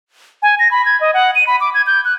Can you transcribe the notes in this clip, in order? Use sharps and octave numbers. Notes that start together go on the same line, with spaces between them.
G#5
A#6
B5
G#6
D#5
F#5
D#7
B5
D6
G#6
G6
F#6